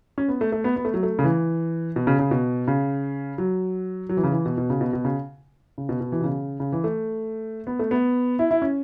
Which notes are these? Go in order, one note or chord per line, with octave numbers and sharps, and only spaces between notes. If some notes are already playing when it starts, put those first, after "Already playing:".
C#4
B3
A3
A3
B3
B3
A3
F#3
A3
C#3
E3
B2
C#3
C#3
B2
C#3
F#3
F#3
E3
C#3
E3
B2
B2
C#3
B2
B2
C#3
C#3
B2
B2
E3
B2
C#3
C#3
E3
A3
B3
A3
B3
E4
E4
C#4